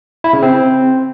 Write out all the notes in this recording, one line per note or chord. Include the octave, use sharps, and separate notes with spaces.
E4
C#3
C4